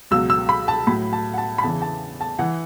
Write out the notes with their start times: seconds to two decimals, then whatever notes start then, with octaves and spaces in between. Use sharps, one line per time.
0.11 C#2 B2 F#3 E6
0.30 E6
0.49 B5
0.68 A5
0.87 A2 F#3 B5
1.13 A5
1.34 F#5
1.38 A5
1.58 B5
1.63 E2 C#3 E3 A5
1.82 A5
2.21 A5
2.39 E3 F#5